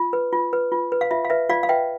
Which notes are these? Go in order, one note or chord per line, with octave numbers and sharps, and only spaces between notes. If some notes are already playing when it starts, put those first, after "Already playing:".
Already playing: F4
B4
F4
B4
F4
B4
F5
F4 E5
F5
B4 E5
F4 D5 F5
F5
B4 E5 G5